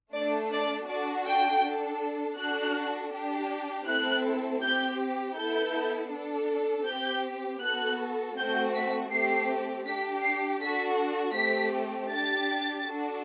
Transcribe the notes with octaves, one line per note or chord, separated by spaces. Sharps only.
A3 D4 A4 D5
D5
D4 F#4 A4 D5
G5
D4 A4
D4 F#4 A4 F#6
D4 G4
A3 C4 E4 A4 F#6
C4 G4 G6
B3 E4 A4 G6
D4 A4
C4 G4 G6
B3 F#4 A4 F#6
A3 C4 F#4 G6
B6
A3 C4 G4 C7
D4 G4 B6
C7
D4 F#4 A4 B6
A3 C4 G4 B6
D4 G4 A6
D4 F#4 A4